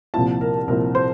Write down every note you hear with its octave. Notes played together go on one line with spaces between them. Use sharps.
C2 A#2 F3 C4 E4 A5
A#4
C2 A#2 F3 C4 E4 A#4
C5